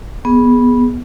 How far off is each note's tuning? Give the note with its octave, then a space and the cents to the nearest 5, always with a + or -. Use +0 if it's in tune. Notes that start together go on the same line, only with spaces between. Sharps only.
B3 -10 G#4 +0